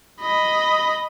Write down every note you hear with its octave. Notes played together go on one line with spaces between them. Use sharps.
D#5 B5